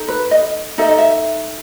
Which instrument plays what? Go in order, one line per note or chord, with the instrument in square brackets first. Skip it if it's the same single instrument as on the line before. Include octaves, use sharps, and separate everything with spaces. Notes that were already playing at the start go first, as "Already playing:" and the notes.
Already playing: [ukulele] D#4 A4
B4
D#5
D#4 A4 E5
D#5
E5